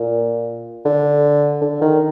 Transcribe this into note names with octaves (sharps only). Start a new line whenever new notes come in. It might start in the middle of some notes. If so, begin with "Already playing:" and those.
Already playing: A#2
D3
D3
D#3